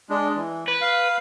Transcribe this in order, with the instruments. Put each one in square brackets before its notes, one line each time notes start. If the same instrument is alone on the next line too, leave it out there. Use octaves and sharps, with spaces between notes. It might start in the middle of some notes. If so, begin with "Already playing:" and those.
[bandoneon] G#3 D4
E3
[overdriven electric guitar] B4
[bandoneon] F5